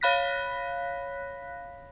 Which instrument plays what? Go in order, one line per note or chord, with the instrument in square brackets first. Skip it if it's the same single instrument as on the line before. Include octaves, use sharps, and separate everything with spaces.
[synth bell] C#5 F5 B5 F#6 A#6 B6